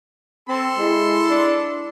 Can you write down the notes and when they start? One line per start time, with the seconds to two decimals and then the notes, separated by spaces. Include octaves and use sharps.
0.49 C4 A4 C6
0.78 G#3 E4
1.30 D4